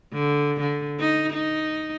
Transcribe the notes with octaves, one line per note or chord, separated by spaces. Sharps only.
D3
D3
D#4
D#4